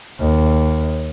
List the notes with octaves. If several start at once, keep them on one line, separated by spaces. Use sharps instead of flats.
D#2